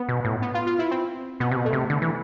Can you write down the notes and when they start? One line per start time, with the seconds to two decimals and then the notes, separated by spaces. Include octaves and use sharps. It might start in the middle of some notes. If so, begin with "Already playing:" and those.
Already playing: B3
0.09 B2
0.25 A2
0.42 B3
0.54 F4
0.67 F4
0.79 E4
0.91 C4
1.40 B2 B3
1.51 C3
1.57 B2
1.65 A3
1.73 C3
1.90 D3
2.02 E3